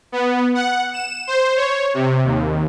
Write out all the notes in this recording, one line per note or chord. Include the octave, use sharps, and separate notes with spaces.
B3
F#5
E7
C5
C#5
C3
D#2